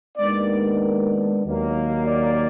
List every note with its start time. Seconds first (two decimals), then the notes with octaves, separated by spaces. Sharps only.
0.17 D#2 D#3 G#3 B3 D4 D5
1.44 D#2 D#3 F#3 A#3
2.08 D5